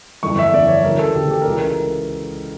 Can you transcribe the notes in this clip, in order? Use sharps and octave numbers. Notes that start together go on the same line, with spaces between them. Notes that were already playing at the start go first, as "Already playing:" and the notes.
G1 F2 E3 C#6
E5
G1 F2 E3 D5
C#5
D2 C#3 E3 A#4
A4
D2 C#3 E3 G4
G4
A#4
C#2 C#3 E3 A4
A#4